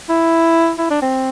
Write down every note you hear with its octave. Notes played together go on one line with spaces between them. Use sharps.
E4
E4
D4
C4